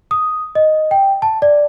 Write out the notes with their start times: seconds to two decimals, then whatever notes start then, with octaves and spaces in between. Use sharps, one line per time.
0.11 D#6
0.55 D#5
0.91 G5
1.22 A5
1.42 D5